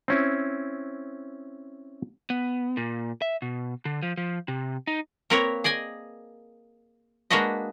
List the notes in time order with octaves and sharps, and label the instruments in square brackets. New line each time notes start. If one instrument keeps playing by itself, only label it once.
[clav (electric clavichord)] C4 C#4 E4
[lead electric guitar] B3
A#2
E5
B2
D3
F3
F3
C3
D#4
[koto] A#3 C4 A#4 B4 C#5
G#4 D5 D#5 G#5
G#3 A#3 D4 F#4 B4 D#5